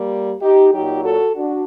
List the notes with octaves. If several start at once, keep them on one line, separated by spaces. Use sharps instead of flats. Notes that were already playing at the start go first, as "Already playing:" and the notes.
Already playing: G3 A#3
D#4 G4
A#2 F#3 D#4 G4
F#4 A4
D4 F#4